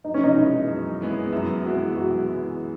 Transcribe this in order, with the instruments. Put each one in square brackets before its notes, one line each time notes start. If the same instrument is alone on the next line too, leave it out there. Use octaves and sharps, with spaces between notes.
[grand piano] F#2 [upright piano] D#4
[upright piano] C#4
D#4
[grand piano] E3 G#3 B3 E4
F#2
E3 G#3 B3 E4
[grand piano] F#2 [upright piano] E4
[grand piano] E3 G#3 B3 E4 [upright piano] F#4
[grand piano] F#2 [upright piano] F#4
[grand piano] E3 G#3 B3 E4